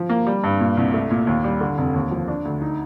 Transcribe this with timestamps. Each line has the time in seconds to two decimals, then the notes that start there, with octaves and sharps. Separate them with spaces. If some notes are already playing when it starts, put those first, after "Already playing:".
Already playing: F3
0.10 A#3
0.27 G3
0.44 G2
0.60 A#2
0.77 C2
0.94 A3
1.10 A#2
1.27 D#2
1.44 G3
1.61 D3
1.78 F1
1.94 D#2
2.11 F3
2.28 D4
2.45 D2
2.61 D#4